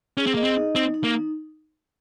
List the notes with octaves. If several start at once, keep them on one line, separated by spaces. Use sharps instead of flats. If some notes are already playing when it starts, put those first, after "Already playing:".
C#4 G#4
C4
A#3 D#5
C4
D#4
C4 D#4
D#4
A#3
D#4